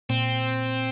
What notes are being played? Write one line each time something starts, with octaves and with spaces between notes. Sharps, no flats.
A#2 C4